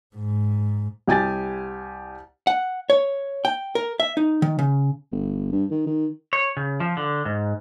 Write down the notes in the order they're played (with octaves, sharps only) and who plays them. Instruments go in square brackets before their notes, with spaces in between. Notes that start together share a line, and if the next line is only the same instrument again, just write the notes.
[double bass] G#2
[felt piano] C2 G4 G#5 A6
[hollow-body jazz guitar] F#5
C#5
G5
A#4
E5
D#4
D#3
C#3
[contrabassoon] G1
G2
D#3
D#3
[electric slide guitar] C#5
C#3
F3
D3
G#2